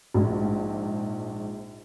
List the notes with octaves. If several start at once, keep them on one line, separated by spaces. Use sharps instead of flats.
A#1 G#2